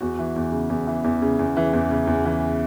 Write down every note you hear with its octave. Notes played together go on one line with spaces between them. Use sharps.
E2 F#4
E3
E2
C#3
E2
E3
E2
C#3
E2
E3
E2
C#3
E2
E3